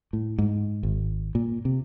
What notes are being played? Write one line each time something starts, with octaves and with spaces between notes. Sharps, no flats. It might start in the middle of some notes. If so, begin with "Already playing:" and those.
A2
G#2
G#1
A#2
C3